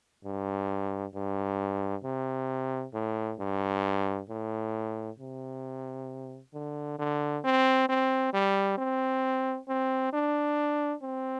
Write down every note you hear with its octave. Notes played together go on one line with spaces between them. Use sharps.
G2
G2
C3
A2
G2
A2
C3
D3
D3
C4
C4
G3
C4
C4
D4
C4